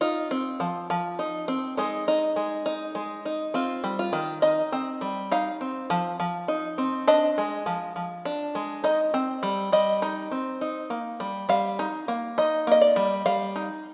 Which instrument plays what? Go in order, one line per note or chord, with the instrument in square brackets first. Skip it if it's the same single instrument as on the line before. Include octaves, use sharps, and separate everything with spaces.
[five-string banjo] D#4 F4
C4
F3
F3
D#4
C4
G#3 D#4
D#4
G#3
D#4
G#3
D#4
C4 F4
G3
F4
D#3
D#4 D#5
C4
G3
D#4 F5
C4
F3
F3
D#4
C4
D4 D#5
G#3
F3
F3
D4
G#3
D#4 D#5
C4
G3
G3 D#5
D#4
C4
D#4
A#3
G3
G3 F5
D#4
A#3
D#4 D#5
A#3 D#5
D5
G3
G3 F5
D#4